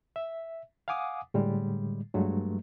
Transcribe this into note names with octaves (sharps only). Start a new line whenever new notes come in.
E5
F5 F#5 G#5 D6 D#6
A2 D3 G3 G#3
G2 F#3 G#3 A3